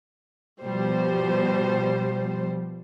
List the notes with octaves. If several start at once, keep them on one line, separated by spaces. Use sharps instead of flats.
B2 F3 G3 C5